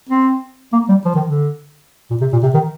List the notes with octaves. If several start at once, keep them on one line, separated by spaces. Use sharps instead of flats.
C4
A#3
G3
F3
D#3
D3
A#2
C3
A#2
C3
D#3